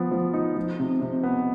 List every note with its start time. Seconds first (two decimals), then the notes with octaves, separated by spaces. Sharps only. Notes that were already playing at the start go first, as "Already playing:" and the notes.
Already playing: F3 B3
0.11 F3
0.33 D#4
0.56 F3
0.80 C3
1.01 C3
1.23 B3